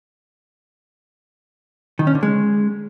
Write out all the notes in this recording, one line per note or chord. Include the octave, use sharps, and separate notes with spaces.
D#3
C#4
D3
G#3